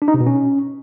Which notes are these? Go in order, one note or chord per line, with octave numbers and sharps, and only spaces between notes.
D4
D#4
C3
B2
C#4